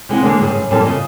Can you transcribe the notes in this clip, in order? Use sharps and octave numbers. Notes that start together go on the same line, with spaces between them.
C3 G#3 E4 F#5
D3 G#3 A#3 D4
G2 C#3 G#4
F#2
F#2 A#2 E3 G3 A4 A5
C#3 D#5 E5